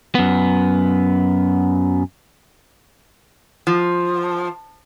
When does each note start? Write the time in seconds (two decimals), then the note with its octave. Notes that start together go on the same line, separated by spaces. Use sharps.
0.15 F#2 B3
3.67 F3